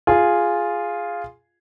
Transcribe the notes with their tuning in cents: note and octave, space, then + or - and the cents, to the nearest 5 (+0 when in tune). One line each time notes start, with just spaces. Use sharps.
F4 +0 G#4 +0